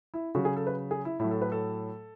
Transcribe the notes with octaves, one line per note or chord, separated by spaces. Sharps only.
E4
C#3 F#3 F#4
G#4
A4
B4
G#4
E4
A2 F#3 E4
A4
B4
A4